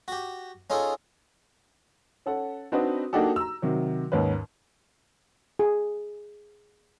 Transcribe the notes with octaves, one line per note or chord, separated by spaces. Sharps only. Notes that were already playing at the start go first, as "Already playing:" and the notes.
F#4 G4
C#4 D#4 F4 G#4 A4
C#4 A4 F#5
C4 D4 D#4 F#4 B4
A#3 D4 D#4 F#4 G4 A4
A#5 E6
C3 D#3 F#3
D#2 G#2 C#4 B4
G#4